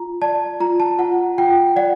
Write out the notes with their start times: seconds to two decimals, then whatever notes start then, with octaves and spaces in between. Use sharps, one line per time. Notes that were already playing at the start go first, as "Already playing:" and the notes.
Already playing: F4 A#5
0.22 D5 A5
0.60 F4 A#5
0.80 A5
0.99 F4 F#5
1.38 F4 G5
1.76 D5 F#5